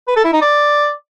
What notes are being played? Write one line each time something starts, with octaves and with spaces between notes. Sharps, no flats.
B4
A4
E4
D#4
D5